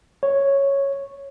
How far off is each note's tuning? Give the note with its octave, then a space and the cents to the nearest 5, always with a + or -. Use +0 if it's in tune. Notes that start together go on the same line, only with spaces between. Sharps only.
C#5 -5